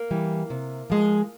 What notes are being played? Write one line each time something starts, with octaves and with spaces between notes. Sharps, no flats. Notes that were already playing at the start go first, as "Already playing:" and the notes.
Already playing: A#3
E3 G3
C3
F3 G#3